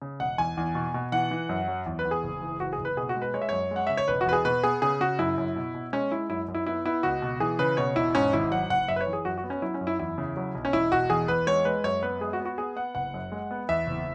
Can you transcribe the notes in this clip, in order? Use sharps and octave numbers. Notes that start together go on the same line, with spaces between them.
C#3
E1 F#5
E2 G#5
E2
B2
B2
E3 F#5
E3
F#2
F#3
E2
B4
E2
G#4
F#1
E3
F#1 F#4
G#4
F#1
B4
B2 G#4
F#4
G#3
B4
G#3 C#5
E5
F#2 C#5
G#3 F#5
C#3 E5
C#5
E1 B4
F#4
E2 B4
G#4
B2 B4
B3 G#4
C#3 G#4
C#3 F#4
F#2 E4
F#2
B2
B2
G#3 C#4
G#3 E4
F#2 E4
F#2
E4
B3 E4
B3 E4
C#2 F#4
B2
E3 G#4
C#3 B4
B2 C#5
E1 E4
G#2 C#4
G#1 E4
F#3 F#5
F#1 F#5
F#2 E5
B4
C#5
E3
G#4
F#2 F#4
F#4
B3
C#4
F#3 E4
C#4
F#2
E4
E2 E4
C#3
F#3
B1
C#4
E1 E4
E1 F#4
E2 G#4
E2 B4
G#3 C#5
G#3 B4
F#2 C#5
B3 B4
G#3 G#4
F#4
B3
F#4
B3 G#4
B3 F#5
F#1 F#5
F#2
G#3
B3
E2 E5
F#1